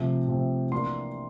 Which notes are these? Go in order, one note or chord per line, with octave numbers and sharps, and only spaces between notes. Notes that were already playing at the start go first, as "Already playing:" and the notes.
Already playing: C3 F3 A3 C4
C3 F3 A3 C4
E3 A#3 D4 C6